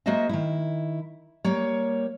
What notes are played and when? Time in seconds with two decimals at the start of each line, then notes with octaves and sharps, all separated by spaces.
0.06 G#3 A#3 F#4 C5 D#5 E5
0.29 D#3 E4
1.44 G3 A#3 C#5